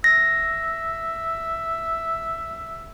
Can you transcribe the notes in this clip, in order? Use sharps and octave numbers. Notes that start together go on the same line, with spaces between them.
E5 A#6